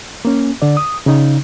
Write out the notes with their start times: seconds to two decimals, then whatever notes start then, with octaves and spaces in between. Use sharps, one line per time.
0.25 A#3 C#4
0.62 D3 D5
0.77 D#6
1.06 C#3 D#4